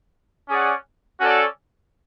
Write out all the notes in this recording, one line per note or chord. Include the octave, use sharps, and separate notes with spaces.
C#4 G#4 D5 F#5
C#4 F#4 A4 D5